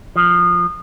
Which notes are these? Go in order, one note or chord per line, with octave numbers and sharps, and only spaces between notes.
F3